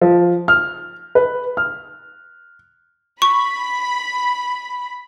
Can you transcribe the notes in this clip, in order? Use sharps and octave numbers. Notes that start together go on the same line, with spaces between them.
F3
F6
B4
F6
B5 C#6